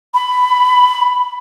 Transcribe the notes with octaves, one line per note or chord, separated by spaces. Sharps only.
B5